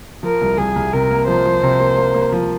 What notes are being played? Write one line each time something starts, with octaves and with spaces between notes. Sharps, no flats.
F3 A#4
C2
C2 G#4
C2
C3 A#4
A#3
F3 C5
F3
C3
A#3
A#3
A#3
F3